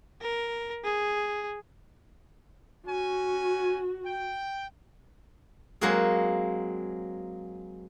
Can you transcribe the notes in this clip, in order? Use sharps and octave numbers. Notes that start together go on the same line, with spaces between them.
A#4
G#4
C#4 F#4 G#5
G5
F#3 G#3 A#3 C4 F#4 G#4